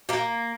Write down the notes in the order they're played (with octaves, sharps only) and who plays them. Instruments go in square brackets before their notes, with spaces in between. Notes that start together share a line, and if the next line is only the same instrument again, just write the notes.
[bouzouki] A#3 G4